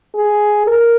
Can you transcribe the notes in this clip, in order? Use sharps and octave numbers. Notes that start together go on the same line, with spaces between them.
G#4
A#4